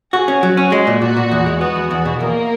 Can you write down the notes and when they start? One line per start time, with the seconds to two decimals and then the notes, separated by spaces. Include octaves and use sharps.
0.13 F#4 G#4
0.28 C#4
0.43 F#3 F#4
0.57 C#4
0.72 G#3
0.87 A#2
1.02 A#2 F#4
1.17 A#2
1.31 E2
1.46 G#3
1.61 B3 F#4
1.76 E2
1.91 E2
2.05 B2
2.20 E2 A#3 A#4